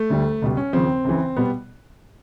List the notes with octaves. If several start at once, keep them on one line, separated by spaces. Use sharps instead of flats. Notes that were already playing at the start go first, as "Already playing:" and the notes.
Already playing: A3
D2 D3 G3
C#2 B2 G3
C#4
D#2 C#3 F3 C4
C#2 C#3 E3
B2 G3 B3